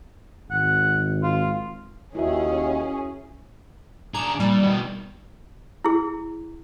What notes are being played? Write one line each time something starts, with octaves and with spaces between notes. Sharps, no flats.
G#1 F#5
F4
D#2 D#3 C#4 E4 F#4 G#4 E5
D4 G#4 A#5
A#2 G3
B2 D#3
E4 G#4